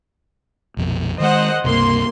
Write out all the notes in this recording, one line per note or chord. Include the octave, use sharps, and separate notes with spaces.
A#1 F2 B2
D#3 G#3 C5 D#5 F#5
C#2 G2 C3 A#3 C6